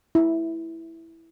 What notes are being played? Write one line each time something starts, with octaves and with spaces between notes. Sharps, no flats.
E4